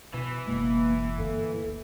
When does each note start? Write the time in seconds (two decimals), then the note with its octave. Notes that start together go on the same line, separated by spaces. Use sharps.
0.14 B2 E3
0.47 F#1 B2 G#3 A#3
1.18 G1 D2 A#3 A4